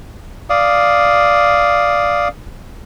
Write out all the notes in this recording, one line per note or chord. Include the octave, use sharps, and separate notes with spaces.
D5 F5 D#6